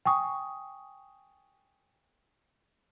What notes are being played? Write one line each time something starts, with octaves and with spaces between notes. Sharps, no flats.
G5 G#5 C#6 D#6